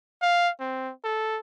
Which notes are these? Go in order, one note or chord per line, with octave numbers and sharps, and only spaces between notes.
F5
C4
A4